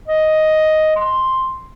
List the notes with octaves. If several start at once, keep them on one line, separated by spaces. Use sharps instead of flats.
D#5
C6